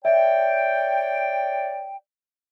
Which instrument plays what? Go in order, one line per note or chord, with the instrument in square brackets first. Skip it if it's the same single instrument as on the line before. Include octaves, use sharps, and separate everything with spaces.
[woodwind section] C#5 D5 G5 [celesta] E5